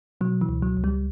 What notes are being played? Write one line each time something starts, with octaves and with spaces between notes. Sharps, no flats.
B2 F#3
E3
C#2
F#3
C#2
G3